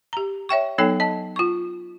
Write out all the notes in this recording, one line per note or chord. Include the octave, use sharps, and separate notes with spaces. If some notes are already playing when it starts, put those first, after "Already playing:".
G4 A#5
C#5 E5 G5 C#6
F#3 B3 D#4 A4 C#5 G5
D#5 A5
F4 C#6